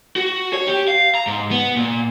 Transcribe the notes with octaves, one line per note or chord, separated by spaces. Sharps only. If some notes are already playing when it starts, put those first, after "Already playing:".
F#4
C#5
G4
F5
A#5
G#2
B3
A#2